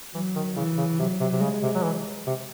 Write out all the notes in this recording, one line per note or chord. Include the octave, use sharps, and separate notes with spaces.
E3 F#3
D#3
C#3 E3
C#3
C3 F#3
C3
C3
C#3 G#3
C3
F#3
E3
C3